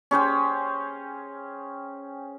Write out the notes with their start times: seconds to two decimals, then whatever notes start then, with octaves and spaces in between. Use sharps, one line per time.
0.11 C#4 G#4 C5 G5